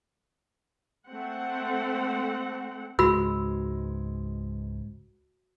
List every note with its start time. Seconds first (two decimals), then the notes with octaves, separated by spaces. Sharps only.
1.09 A3 C4 F#5
2.99 C#2 G#2 G#3 F#4 B5 E6